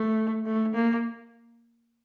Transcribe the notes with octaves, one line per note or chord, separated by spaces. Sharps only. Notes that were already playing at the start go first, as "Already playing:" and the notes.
Already playing: A3
A3
A#3